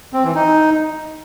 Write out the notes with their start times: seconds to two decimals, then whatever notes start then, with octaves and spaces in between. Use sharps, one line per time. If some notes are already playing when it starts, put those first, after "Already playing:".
0.13 C4
0.24 E3
0.35 D#4